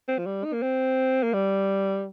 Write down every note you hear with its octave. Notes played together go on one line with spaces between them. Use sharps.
C4
F3
G3
D#4
A#3
C4
A#3
G3